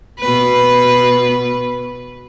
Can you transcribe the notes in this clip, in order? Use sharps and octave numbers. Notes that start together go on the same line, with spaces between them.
B2 B4